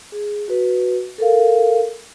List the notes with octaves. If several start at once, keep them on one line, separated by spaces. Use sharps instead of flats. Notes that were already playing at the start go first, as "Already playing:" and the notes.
G#4
F#4 B4
A4 A#4 F5